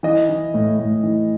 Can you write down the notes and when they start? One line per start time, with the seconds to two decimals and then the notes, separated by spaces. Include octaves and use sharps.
0.03 E3 D#5
0.29 E3
0.54 A2
0.79 A2
1.03 E3